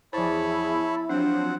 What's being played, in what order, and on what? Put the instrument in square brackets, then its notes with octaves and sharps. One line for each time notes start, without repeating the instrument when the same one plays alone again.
[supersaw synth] E2 G#4 [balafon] F3 C5 [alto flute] E4 [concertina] C#5 A5 B5
[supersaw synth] F3 F#3 C4 [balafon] D4 [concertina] C5 F#5